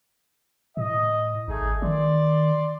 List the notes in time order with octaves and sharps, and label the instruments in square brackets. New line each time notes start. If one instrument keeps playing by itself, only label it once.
[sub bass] A2 [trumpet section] D#5
[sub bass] G#1 [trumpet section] A3 D#4 G#4
[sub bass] D#3 [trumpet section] D5 C6